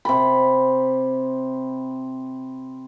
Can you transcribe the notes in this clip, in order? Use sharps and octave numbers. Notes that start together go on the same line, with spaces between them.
C3 B5